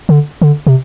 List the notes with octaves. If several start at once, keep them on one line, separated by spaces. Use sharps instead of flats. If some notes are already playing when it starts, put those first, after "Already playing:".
D3
D3
C3